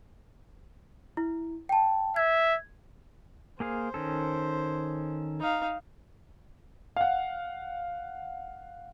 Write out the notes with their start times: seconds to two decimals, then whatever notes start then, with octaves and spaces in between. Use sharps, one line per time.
1.17 E4
1.69 G5 A5
2.16 E5 G#6
3.60 A#3 G#4 C5 F5
3.94 D#3 C#4 A4
5.40 D#4 F5
6.96 F5 F#5